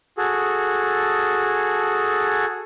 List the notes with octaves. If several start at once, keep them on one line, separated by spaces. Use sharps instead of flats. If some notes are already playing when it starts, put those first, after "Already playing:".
F#4 G#4 A4